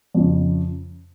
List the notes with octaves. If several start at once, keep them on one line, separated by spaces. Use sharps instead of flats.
F2 C#3 F3